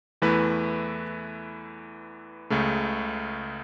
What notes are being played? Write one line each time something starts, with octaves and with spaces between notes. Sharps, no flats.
E2 E3 A3 E4 B4
C#2 C#3 A3